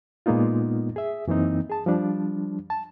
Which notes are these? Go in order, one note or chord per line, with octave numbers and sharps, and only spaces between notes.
A#2 G#3 A#3 B3 D#4 F4
G#4 E5
F#2 E3 A#3 C4 D#4
G#4 A5
F3 G3 D4
A5